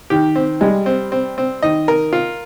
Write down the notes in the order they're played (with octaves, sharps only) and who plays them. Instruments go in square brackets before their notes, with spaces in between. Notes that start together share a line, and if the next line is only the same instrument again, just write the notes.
[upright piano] D#3 [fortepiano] G4
[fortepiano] C4
[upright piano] G3 [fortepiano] G#3
[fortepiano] C4
C4
C4
[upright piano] D#3 [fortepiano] D#5
[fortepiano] A#4
F4